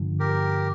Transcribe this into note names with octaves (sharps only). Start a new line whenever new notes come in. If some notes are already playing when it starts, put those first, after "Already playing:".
Already playing: G2 D3 F3
G4 A#4